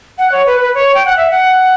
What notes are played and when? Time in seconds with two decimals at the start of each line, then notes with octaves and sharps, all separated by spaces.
0.18 F#5
0.32 C#5
0.46 B4
0.61 B4
0.74 C#5
0.94 G5
1.05 F#5
1.17 E5
1.30 F#5